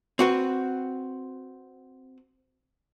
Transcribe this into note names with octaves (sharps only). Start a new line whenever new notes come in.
C4 F#4 B4